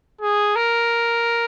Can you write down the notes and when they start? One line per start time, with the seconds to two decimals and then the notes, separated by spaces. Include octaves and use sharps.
0.21 G#4
0.56 A#4